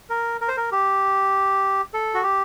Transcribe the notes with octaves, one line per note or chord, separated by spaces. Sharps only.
A#4
A#4
C5
A#4
G4
A4
F#4
G4